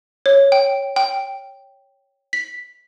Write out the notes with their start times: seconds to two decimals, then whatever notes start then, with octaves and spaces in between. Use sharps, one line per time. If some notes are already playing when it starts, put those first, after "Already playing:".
0.26 C#5
0.52 G5
0.96 G5
2.33 B6